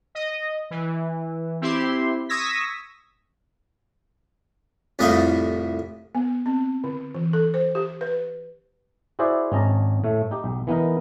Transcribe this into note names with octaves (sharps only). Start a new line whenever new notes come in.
D#5
E3
C4 E4 G4 C6
C#6 D#6 E6 G#6 A#6 B6
C2 F2 A2 A3 D#5 F5
B3
C4
D3
E3
A4
C5
G4
B4
E4 F#4 G#4 C5 D5 E5
G#1 C#4 D#5 A5 A#5
A2 A3
D#4 G4
B1
E3 B3 D#4 A#4